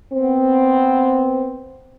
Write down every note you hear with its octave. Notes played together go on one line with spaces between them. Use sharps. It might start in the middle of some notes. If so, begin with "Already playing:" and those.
B3 C4